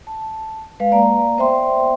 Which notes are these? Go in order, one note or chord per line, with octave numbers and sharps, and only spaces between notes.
A5
G#3 B4 F5
A#3 D5 A#5
B3 C5 D5 E5 G5 C6